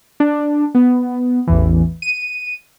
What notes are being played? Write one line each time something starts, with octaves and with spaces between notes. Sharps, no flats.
D4
B3
A1 E2 E3
D#7